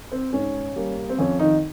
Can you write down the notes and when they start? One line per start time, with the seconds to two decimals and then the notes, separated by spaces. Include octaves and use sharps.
0.12 C4
0.33 G#2 C#4
0.76 G3 A#3
1.09 C4
1.19 F2 C#4
1.39 D#3 D#4